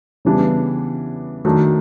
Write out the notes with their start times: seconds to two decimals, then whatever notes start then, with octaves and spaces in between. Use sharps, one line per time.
0.25 C#3 E3 G3 B3 D4
1.45 D#3 F#3 A3 D4